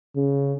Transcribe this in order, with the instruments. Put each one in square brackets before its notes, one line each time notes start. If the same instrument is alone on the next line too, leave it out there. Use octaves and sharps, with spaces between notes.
[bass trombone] C#3